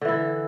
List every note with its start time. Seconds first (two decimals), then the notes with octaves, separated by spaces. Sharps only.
0.01 D3
0.05 E3
0.08 E4